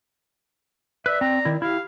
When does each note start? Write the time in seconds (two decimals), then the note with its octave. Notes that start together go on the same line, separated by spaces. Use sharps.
1.06 B4 D5 E5
1.21 C4 A#5
1.45 D#3 E4
1.62 E4 G4 F5